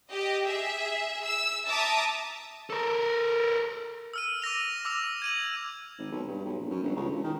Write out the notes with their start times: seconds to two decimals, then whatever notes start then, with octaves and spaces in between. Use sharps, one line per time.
0.10 G4 D#5
0.46 G#4 E5
1.24 E6
1.66 E5 A5 A#5 D6 D#6
2.70 A4 A#4
4.13 E6 F6 D#7
4.42 D6 E6 A#6 F7
4.85 D6 E6 F7
5.22 G#6 D#7 F#7
5.99 G#1
6.12 B1
6.28 G2
6.45 B1
6.60 A#1
6.71 F#2
6.84 G1
6.96 C#2
7.11 E1
7.24 D#3